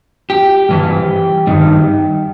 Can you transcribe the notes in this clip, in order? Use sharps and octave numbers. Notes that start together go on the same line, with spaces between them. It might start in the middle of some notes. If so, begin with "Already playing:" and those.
G4
G2 E3
G2 D#3